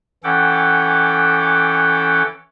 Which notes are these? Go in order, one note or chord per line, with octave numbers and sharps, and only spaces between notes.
E3 C#4 A4 F#5 G5 D6